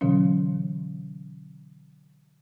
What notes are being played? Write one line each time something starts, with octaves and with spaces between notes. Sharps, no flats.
B2 D3 E3 F#3 C#4